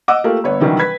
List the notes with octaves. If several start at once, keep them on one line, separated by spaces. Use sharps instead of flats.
D#5 F#5 D6 E6
A3 A#3 F4 G4
G1 B3 C#5
C3 D#3 E3 F#3 G3 D4
B4 G#6 B6